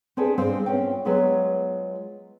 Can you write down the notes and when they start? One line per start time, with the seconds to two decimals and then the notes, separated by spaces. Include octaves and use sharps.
0.17 C4 D4 G#4 A4 B4
0.38 G#2 G3 C4 C5 F5
0.66 B3 C#4 F4 G5
1.05 F#3 G#3 B3 F4 G#4